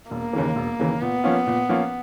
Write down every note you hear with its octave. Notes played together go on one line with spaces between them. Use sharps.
E1 A#3
D#2 C#3 E3
E1
D#2 C#3 E3
A#2 B3
F3 A#3 C#4 F4
A#2
F3 A#3 C#4 F4